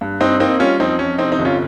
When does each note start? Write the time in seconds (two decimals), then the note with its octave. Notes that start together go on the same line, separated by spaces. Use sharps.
0.01 G2
0.21 G2 C4 D#4
0.40 A#3 C4 D#4
0.60 G3 C#4 F4
0.80 F2 C4 D#4
0.99 F2 C#4
1.18 C3 C4 D#4
1.32 C4 D#4
1.39 G1
1.45 C#4 F4